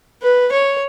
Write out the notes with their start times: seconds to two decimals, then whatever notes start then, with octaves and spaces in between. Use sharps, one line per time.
0.22 B4
0.52 C#5